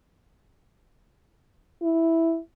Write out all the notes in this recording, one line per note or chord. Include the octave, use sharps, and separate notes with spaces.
E4